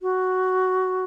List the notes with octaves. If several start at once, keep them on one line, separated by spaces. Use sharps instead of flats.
F#4